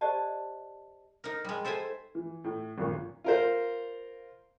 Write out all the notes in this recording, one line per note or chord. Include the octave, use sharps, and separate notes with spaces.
G4 C5 D5 D#5 A5
D#4 A#4
G3 G#3
A4 C5 E5 G5 G#5
E3
A2
G#1 F#2 A#2 C#6
F4 A#4 C5